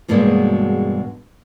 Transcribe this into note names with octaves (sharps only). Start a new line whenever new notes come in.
E2 G2 B2 F#3 G#3 A#3